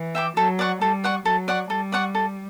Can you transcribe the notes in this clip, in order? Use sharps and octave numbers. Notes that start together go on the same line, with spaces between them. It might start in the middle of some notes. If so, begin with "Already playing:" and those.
Already playing: E3
E5 G5 D6
F#3 A4
D5 F#5 C#6
G3 A4
D5 F#5 C#6
F#3 A4
D5 F#5 C#6
G3 A4
D5 F#5 C#6
A4